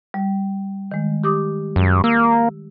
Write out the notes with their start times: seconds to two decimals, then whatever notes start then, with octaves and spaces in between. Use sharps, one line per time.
0.14 G3
0.91 D#3 G#3
1.24 G4 D6 D#6
1.76 F#2
2.04 A#3 E6